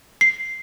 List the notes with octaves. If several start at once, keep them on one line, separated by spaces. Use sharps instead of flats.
C7